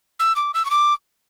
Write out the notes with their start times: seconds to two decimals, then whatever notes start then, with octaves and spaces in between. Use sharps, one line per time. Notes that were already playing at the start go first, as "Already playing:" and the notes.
0.20 E6
0.36 D6
0.54 E6
0.65 C#6
0.70 D6